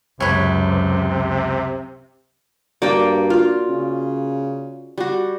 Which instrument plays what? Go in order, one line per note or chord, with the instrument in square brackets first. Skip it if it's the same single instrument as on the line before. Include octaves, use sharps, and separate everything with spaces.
[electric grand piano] C#2 [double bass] F#2 [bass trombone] C3 [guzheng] B4 C#5
[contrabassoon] G2 [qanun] A#3 G5 [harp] F#4 D5
[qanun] F4
[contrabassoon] C#3
[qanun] G3 F#4